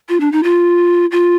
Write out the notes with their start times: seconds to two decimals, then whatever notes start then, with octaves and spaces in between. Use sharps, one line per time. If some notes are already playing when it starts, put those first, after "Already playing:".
0.09 F4
0.20 D4
0.32 D#4
0.44 F4
1.12 F4